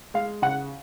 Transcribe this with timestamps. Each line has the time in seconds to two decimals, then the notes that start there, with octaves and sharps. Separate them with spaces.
0.14 G#3 F5
0.42 C#3 F#5